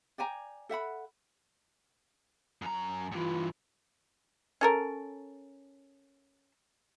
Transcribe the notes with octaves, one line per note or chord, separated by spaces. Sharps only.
D5 G5 G#5 A#5
A4 E5 F#5 B5
F#2 A#5
G2 E3 F4
C#4 A4 A#4